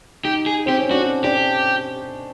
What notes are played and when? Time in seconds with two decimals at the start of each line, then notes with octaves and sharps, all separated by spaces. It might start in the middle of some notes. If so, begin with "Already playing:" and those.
0.24 D#4 G4
0.46 G#4
0.66 C4 G4
0.78 C#4
0.90 D4 F#4
1.24 D4 G4